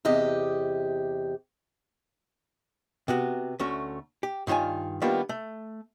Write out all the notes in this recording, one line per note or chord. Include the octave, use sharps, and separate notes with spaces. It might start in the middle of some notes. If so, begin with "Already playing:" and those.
E2 C3 G4 D#5
C3 B3 F#4
D2 A3 C#4 F#4
G4
G2 D#3 F4 C#5 G#5
D#3 G3 A#3 B3 D4 F4
A3